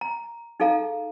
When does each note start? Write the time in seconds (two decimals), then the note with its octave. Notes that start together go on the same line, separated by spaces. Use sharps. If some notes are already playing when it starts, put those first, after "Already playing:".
0.01 A#5
0.60 D#4 G#4 A4 F5 A#5